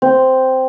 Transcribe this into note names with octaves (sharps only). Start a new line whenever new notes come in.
C4